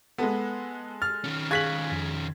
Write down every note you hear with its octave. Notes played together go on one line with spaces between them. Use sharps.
G#3 B3 A4
F6 A6
D#3 C#4
G#4 F5 C#6 F#6 G#6 B6 F#7
F2